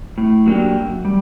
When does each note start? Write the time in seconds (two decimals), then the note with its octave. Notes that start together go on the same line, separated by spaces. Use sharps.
0.18 A2
0.46 F#3 A#3 D4 G4
0.76 F#2
1.05 G3